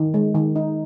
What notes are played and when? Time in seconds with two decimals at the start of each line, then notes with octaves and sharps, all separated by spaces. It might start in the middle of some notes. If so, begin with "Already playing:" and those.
Already playing: D#3
0.14 G#3
0.35 D#3
0.56 D#4